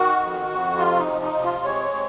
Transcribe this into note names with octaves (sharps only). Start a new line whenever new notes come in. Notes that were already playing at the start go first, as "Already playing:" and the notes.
Already playing: D#3 F#4
F2
F2
C3 F4
D#4
F3
D#4
C3
F4
G#3 C#5
C3